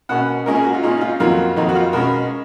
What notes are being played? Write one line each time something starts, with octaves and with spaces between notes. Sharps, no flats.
B2 A#3 C#4 F#5
A#2 G#3 C#4 A#4
G#4
F#4
F4
A#2 G#3 C#4 D#4
D#4
F4
F2 D#3 F#3 A#3 F4
F2 D#3 F#3 A#3 D#4
F#4
F4
B2 G#3 C#4 A#4